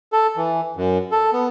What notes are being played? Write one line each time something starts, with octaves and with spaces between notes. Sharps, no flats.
A4
E3
F#2
A4
B3